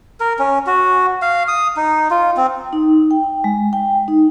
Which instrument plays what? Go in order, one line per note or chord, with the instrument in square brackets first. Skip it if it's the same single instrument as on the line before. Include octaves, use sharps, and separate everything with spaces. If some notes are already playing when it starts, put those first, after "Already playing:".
[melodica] A#4
C#4
F#4
F5
D#6
D#4
F4
C4
[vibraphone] D#4
G5
G#3
G5
D#4